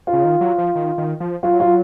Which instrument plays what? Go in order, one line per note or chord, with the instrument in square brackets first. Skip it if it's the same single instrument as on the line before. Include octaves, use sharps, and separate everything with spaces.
[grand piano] F4
[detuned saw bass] C#3
D#3
F#3
F3
D#3
D#3
F3
[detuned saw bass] F#3 [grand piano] F4
[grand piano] F4